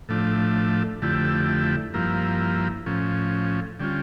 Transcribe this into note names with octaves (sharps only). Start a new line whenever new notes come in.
A2 F3 A3 D4
F2 D3 A3 E4 G4
G2 F3 A#3 E4
A2 F3 C#4
D3 G3 C#4 F4